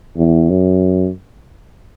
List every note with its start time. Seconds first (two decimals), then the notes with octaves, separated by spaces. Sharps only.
0.17 E2
0.50 F#2